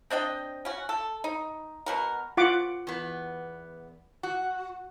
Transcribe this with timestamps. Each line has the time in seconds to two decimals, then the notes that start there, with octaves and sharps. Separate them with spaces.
0.10 C4 D4 D#5 G5
0.65 C#4 F#4
0.89 A4
1.24 D#4
1.86 B2 F#4 A#4
2.37 F4 F#5 D6
2.87 E2 B3
4.23 F#4